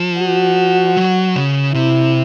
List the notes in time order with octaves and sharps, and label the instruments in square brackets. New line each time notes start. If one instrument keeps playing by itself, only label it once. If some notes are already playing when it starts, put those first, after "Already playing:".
Already playing: [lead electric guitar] F3
[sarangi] F#4
[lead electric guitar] F#3
C#3
[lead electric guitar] C3 [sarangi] E4